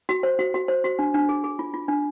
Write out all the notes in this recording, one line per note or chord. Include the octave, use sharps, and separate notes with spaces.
F#4
C5
F#4
F#4
C5
F#4
D4
D4
G#4
G#4
F4
F4
D4